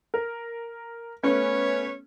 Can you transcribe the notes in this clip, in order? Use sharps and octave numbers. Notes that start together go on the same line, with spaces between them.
A#4
A3 B3 C#4 B4 C#5